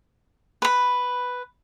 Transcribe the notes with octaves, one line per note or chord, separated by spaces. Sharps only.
B4 B5